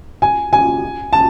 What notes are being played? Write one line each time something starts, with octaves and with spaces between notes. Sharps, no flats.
G#5
G#5
A5